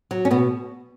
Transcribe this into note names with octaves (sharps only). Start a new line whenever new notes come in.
F#3
C#4
B2 B3